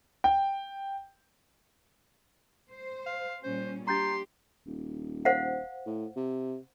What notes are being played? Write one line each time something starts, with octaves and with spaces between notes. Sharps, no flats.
G5
C5
F5
A#2 G3 C#4 C5
D4 G4 A#5 C6 G6 A6
D#1
C5 F5 F#5
A2
C3